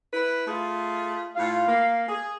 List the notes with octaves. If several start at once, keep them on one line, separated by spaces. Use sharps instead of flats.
E4 B4
A3 F4 G#4
A2 F4 F5
A#3
G#4